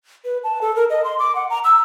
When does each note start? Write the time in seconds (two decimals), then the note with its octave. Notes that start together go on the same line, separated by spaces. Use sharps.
0.25 B4
0.44 A5
0.61 A4
0.76 A#4
0.90 D#5
1.04 C6
1.19 D6
1.35 F#5
1.50 A#5
1.64 E6